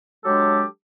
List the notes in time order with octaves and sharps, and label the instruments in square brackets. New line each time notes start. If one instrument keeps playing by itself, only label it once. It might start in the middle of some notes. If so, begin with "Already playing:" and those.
[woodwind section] F#3 G#3 D4 G4 A4